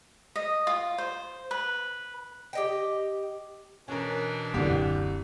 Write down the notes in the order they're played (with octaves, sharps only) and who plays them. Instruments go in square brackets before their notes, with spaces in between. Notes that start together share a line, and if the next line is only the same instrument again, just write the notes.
[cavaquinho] D#5
F4
C5
B4
[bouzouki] G4 D#5 G5
[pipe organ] B2 E3 D4 [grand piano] C#4 A#4
[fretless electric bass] D#1 F#2 D3 [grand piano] C2 G4